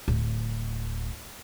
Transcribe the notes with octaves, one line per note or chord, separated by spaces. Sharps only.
D1